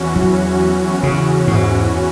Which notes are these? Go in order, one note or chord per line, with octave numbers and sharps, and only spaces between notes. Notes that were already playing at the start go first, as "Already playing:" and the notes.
Already playing: E2 E3 C#4 F#4
F#3
C#3
G#2